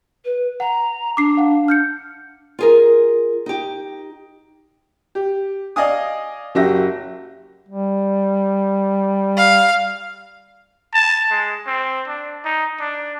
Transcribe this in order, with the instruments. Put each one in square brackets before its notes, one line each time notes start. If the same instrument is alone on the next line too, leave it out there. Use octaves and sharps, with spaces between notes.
[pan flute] B4
[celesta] F#5 [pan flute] A#5
[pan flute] D4 [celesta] D6 C7
[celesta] F5 F#5
F6 G6 C#7
[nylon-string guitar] F4 G#4 A#4
D#4 G4
[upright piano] G4
D5 D#5 F5 G#5 D#6
F#1 F#4 G4 E5 A#6
[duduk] G3
[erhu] F5
[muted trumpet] A5
G#3
C4
D4
D#4
D4